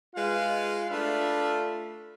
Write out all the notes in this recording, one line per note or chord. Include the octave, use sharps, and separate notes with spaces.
G#3 F4 B4 F5
A3 D4 F4 B4 E5